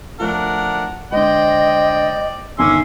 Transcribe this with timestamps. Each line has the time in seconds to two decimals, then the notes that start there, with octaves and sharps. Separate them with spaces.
0.20 F3 A3 D4 A#4 F#5 F#6
1.12 D3 G#3 C5 D5 D#5 G5
2.59 G1 D#2 C#4 E5 G#5 C6 D6